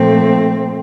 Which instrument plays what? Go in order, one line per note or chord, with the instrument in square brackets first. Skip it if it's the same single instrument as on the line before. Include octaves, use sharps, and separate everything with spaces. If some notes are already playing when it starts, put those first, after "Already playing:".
Already playing: [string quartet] A#2 F3 A3 C4